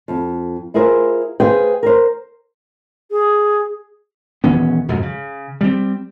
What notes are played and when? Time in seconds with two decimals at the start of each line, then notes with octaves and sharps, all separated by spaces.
0.08 F2
0.74 E4 F4 G#4 A#4 C5
1.40 G#4 B4 C5 F5 G5
1.83 A#4 C5
3.11 G#4
4.44 D#1 E3 B3 C#4
4.88 F2 G#2 B2
5.03 C#3
5.61 G3 C4